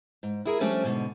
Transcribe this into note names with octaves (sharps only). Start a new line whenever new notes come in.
G#2
E4 G#4 A#4
F3 G3 A3 C#4 D4
G#2 B2 D3